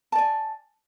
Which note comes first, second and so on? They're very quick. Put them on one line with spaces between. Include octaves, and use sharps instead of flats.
A5 D5 G#5